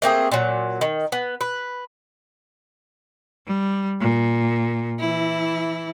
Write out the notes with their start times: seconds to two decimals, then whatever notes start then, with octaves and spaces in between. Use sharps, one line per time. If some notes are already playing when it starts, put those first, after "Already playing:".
0.02 A3 A#3 C4 G#4
0.32 A#2 F#3
0.81 D#3
1.12 B3
1.41 B4
3.47 G3
4.01 A#2
4.99 E3 E4